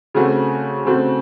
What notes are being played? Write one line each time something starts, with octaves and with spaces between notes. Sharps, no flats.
C#3 A3 C4 F#4
C#3 A3 C4 F#4